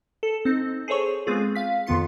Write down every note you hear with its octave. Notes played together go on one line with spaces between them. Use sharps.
A4
C4 D#4
G#4 A4 C5 C#5 C#6
G#3 B3 C4 F4 G#4
F5 B6
F2 D#3 B3 F4 C6 C#7